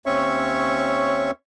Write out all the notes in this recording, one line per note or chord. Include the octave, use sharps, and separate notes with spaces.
D#2 C4 C#4 C#5 E5 C#6